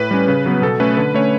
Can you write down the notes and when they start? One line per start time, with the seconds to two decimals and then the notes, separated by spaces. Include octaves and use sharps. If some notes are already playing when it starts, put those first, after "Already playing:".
Already playing: A2 B4
0.11 G3 C#4
0.28 C#3
0.46 F#3 B3
0.62 B2 A4
0.80 A3 C#4 B4
0.97 D3 B4
1.14 A3 C#4 C#5